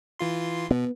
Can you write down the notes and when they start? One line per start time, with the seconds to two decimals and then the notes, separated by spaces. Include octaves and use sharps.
0.19 E3 F4 C6
0.71 B2 B3